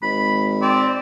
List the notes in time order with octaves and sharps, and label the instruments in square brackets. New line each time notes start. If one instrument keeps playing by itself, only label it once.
[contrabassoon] G#1 [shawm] B5
[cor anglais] C4 [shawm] D5